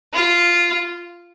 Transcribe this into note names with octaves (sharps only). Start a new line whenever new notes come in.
F4